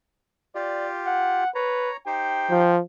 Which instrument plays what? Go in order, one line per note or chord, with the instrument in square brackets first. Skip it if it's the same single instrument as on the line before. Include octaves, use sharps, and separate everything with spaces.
[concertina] F4 G4 [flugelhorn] D5
[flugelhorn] F#5
[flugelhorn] B4 [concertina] C#5 A#5
[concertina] D#4 G4 C5 [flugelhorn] G5
[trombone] F3